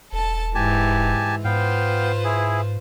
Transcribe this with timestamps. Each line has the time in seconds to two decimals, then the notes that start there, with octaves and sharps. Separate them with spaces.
0.13 E1 A4 A5
0.55 G#2 E3 G4 G#5 A5
1.44 G#2 B3 F4 B4 C5 F5 G5
2.24 E4 G#4